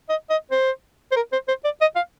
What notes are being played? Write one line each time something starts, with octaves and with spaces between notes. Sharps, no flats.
D#5
D#5
C5
C5
A#4
C5
C5
D5
D#5
F5